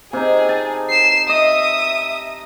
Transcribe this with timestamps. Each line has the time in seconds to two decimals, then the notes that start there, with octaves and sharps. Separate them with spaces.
0.13 C3 D#4 G#4
0.49 A5
0.90 C7 E7
1.29 D#5 E5 D#6